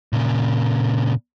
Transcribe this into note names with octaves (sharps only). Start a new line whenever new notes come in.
A#2 C#3